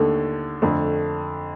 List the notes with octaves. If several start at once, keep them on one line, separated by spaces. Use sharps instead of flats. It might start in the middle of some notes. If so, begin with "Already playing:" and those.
Already playing: D#2 D3 A3 A4
F2 D3 A3